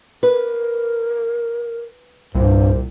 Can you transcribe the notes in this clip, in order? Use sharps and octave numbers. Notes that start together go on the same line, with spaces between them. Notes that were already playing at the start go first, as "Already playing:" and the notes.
A#4 B4
C2 G2 A#2 C5